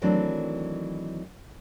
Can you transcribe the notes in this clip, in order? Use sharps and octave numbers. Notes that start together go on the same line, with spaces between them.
D#3 E3 F#3 A3 C4 D4